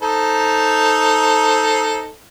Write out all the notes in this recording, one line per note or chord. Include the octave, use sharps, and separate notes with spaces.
D#4 A4 C5